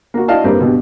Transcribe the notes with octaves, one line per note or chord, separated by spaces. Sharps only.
A#3 F#4
E4 F#4 D5 D#5 F5 A5
G2 G3 A#3 C4 B4
G2 B2 G3